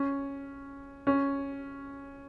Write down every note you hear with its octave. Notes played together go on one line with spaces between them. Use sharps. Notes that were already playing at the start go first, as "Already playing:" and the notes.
Already playing: C#4
C#4